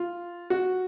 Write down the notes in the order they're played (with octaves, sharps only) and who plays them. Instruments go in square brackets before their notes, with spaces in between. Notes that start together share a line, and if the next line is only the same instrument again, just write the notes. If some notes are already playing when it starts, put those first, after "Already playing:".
Already playing: [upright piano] F4
F#4